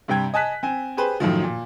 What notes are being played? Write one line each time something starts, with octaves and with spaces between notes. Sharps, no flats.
G2 C3 G3 G5 G#6
D#5 G#5 A5 F#6 B6
C4 G#5
G4 G#4 B4 C5
F#2 A2 D#3 F3
A#2